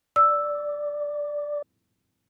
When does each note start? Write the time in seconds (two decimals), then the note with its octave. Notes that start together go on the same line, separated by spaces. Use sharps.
0.16 D5 E6